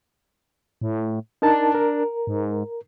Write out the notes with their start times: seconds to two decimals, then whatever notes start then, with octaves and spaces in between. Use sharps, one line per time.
0.81 A2
1.42 D4 D#4 A#4 A5
1.75 A#4
2.27 G#2